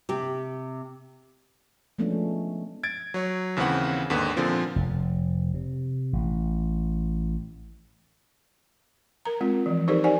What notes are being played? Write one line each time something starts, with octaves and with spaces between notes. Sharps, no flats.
C3 G4
F3 G#3 A3 B3 C#4 D4
G#6 A6 D7
F#3 C#5
D#2 C#3 E3 C4 B4 F#5
D#2 G#2 D3 B3
A#2 D3 F3 C4
F1
C3
A1
A#4 A#5
G#3 C4 F4
E3 F3
D#4 G4 A4 A#4 C5 D5
D#4 C5 D5 F#5 G#5